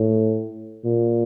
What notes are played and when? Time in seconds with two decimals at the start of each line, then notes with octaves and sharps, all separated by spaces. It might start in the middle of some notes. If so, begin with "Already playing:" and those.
Already playing: A2
0.85 A#2